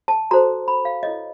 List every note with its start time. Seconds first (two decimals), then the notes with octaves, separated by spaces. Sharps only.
0.08 A5
0.31 F#4 A4 C5 A#5
0.68 B5
0.85 F5
1.03 E4 A4 C#5 D#5